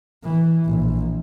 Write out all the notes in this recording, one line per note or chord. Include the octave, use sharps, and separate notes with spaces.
E3
A#1